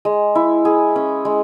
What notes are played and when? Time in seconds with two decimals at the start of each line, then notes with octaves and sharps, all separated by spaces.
0.05 G#3
0.35 E4
0.65 G#4
0.96 C#4
1.25 G#3